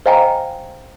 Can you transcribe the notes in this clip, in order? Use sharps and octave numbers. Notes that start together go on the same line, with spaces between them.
C5 D#5 F5 G5 G#5 A#5